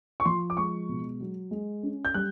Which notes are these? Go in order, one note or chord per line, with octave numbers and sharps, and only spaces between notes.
C#6
F3 C6
D6
G#3 C#6
B2
F#3
G#3
C#4
G6
G3 F#6